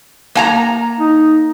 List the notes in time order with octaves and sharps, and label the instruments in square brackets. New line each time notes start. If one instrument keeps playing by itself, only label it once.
[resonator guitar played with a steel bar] A#3 G#5 A#5
[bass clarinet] D#4